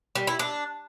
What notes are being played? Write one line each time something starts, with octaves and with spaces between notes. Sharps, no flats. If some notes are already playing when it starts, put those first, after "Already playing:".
G3
E4
D4